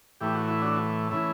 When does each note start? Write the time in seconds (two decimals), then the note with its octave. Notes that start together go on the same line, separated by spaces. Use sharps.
0.20 A2 E3 A3 G4
0.35 F#4
0.48 E4
0.61 D4 F#4
1.11 E3 A3 C#4 E4